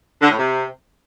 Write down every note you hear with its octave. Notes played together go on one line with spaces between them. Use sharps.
D3
A2
C3